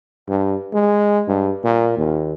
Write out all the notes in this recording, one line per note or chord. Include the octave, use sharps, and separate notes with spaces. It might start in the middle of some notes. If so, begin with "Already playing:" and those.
G2
G#3
G2
A#2
D#2